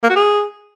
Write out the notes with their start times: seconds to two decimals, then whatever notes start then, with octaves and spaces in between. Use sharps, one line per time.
0.03 A#3
0.10 F#4
0.16 G#4